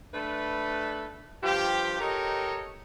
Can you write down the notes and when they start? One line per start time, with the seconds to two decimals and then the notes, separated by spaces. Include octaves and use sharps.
0.14 A3 D4 A4 B4
1.43 G2 F3 F4 G4
2.00 D#4 G4 A4 A#4 C#5 D#5